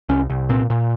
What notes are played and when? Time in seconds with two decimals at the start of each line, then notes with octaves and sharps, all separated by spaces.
0.09 C2 C#4
0.30 C2
0.49 A#2 C4
0.70 A#2